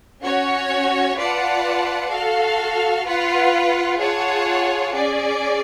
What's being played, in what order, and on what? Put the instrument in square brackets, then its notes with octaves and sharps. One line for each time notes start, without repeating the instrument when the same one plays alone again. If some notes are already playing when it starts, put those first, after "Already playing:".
[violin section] C#4 F#4 C#5
F4 B4 D5 F#5 A5
F#4 A4 F5
F4 B4 F#5
F4 G#4 C#5 F#5 A5
C#4 G#4 D5